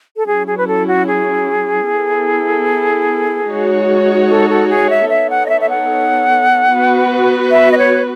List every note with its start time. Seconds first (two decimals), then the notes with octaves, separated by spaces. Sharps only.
0.17 A4
0.27 F#3 C#4 E4 G#4
0.47 G#4
0.57 B4
0.67 A4
0.88 F#4
1.07 G#4
1.88 B3 E4 A4
3.49 G#3 D#4 F#4 C#5
4.30 A4
4.50 A4
4.69 G#4
4.90 E5
5.10 B3 D#4 A4 C#5 E5
5.30 F#5
5.46 D#5
5.49 E5
5.61 E5
5.69 F#5
6.71 B3 F#4 B4
7.51 E5
7.72 D#5
7.78 C#5